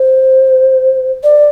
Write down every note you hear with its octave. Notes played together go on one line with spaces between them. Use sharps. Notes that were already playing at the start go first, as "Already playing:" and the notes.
Already playing: C5
D5